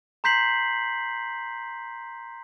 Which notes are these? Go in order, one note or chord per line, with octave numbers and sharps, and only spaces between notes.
A#5 C6 G6 B6 C7 F#7